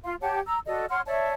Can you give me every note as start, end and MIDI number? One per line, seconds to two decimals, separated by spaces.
0.03 0.14 65
0.03 0.14 77
0.03 0.14 84
0.21 0.40 67
0.21 0.40 73
0.21 0.40 78
0.21 0.40 81
0.45 0.58 82
0.45 0.58 88
0.66 0.86 66
0.66 0.86 69
0.66 0.86 74
0.66 0.86 75
0.90 1.01 73
0.90 1.01 78
0.90 1.01 84
0.90 1.01 89
1.06 1.34 73
1.06 1.34 74
1.06 1.34 76
1.06 1.34 81